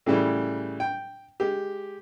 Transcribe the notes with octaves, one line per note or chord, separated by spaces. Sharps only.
A2 C#3 E3 G3
G5
G#3 G4